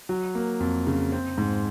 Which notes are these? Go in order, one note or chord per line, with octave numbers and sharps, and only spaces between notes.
F#3
A#3
F2
C#3
C4
G#2